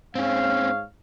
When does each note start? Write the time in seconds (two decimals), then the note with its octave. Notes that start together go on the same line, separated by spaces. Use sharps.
0.15 G#2 C4 C#4 C#5 F5